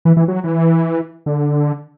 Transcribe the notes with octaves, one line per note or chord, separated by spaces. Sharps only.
E3
E3
F#3
E3
D3